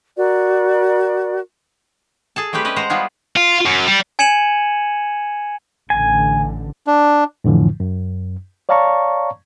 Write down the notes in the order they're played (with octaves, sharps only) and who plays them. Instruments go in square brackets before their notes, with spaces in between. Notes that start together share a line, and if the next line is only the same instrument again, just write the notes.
[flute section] F#4 A#4 D5
[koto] G#4 A4 A5
G3 A3 C4 G4 B4
C#4 B4 D#5
G#3 C5 F#5 A#5
G3 B3 F4 F#4 G#4
[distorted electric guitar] F4
F#2
G3
[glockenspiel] G#5 G#6 C#7 D#7 E7 F#7
[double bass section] A1 D3 [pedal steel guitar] G#5
[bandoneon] D4
[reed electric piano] F2 A2 D3 E3 F3
F#2
C#5 D5 F5 A5 A#5 C#6